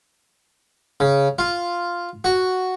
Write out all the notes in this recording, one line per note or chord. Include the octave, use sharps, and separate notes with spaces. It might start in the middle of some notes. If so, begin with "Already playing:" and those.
C#3
F4
F#4